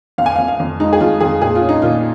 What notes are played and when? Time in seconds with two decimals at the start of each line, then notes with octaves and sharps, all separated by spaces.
0.18 F2 F5
0.26 G#5
0.36 F5
0.38 F2
0.48 F5
0.60 F2
0.80 G#3 D#4
0.93 G#4
1.00 F2 F4
1.20 F2 G#4
1.42 A#2 G#4
1.55 F4
1.62 C#4
1.69 D#4
1.82 A#2 F4